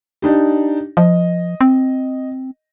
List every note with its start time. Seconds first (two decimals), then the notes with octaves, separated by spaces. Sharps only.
0.22 D4 D#4 G4
0.97 F3 D#5
1.61 C4